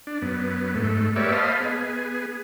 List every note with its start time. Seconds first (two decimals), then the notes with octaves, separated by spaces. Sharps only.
0.07 D4
0.22 F#2 B3
0.75 G#2 A3
1.16 A#3 G4 B4 C#5 D5 E5
1.32 C5 D#5 F5 A5 B5
1.60 B3 G#4